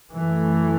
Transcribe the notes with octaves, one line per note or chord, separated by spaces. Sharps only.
F#2 E3 A3